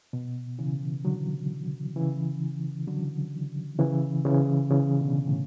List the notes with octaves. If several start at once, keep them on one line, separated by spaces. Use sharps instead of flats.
B2
C#3 E3
D3 F#3
C#3 E3
D3 F#3
C#3 E3
C#3 E3
C#3 E3
B2 D3
A2